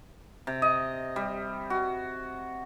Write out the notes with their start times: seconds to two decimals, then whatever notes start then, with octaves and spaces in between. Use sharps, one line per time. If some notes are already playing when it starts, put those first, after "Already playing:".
0.47 C3
0.62 D#5
1.16 G3
1.70 F#4